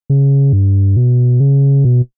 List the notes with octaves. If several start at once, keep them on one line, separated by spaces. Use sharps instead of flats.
C#3
G2
B2
C#3
B2